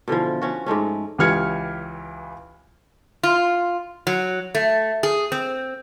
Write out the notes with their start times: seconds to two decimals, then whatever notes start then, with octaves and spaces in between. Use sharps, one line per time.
0.08 B2 D3 E3 F3
0.42 F3 C#4 F#4
0.66 G#2 G#3 A3 C#4
1.18 C#2 E3 G4 F6 G#6 C#7
3.23 F4
4.07 F#3
4.55 A3
5.03 G#4
5.32 C4